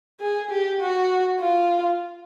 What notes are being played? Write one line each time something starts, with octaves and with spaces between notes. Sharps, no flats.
G#4
G4
F#4
F4